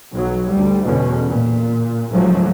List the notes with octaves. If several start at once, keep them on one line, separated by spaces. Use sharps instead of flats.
B1 F#3
D2 G3
E2 B2 D3 C#4
A#2
C#2 G#2 F3 F#3 A3